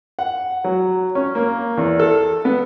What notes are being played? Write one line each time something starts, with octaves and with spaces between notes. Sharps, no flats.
F#5
F#3
C#4
A#3
E2
A4
B3